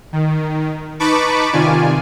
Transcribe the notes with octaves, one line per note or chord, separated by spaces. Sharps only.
D#3
D#4 B4 A5 B5 C#6 D6
C3 D#3 F4 D5 G#5